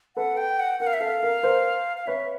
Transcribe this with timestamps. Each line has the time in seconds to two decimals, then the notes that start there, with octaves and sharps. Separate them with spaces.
0.16 A4 B4 F#5
0.37 G5
0.59 F#5
0.80 A#4 F#5
0.87 F5
0.94 E5
1.01 A4 F5
1.23 A#4
1.43 A#4 C5
1.97 F5
2.07 B4 C#5 E5